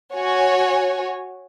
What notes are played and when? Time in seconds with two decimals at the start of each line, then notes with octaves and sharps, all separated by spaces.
0.14 F#4 C#5 G#5